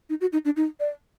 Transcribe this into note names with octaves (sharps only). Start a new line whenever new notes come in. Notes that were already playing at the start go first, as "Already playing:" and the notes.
D#4
F#4
D#4
D4
D#4
D5